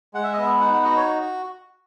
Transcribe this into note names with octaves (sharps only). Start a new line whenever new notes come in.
G#3 F#5
E5
D#5
B3 E5
D#4 F#5
F#5
F#4 D#5
C#5